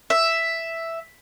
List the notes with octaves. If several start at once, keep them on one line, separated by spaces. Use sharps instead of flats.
E5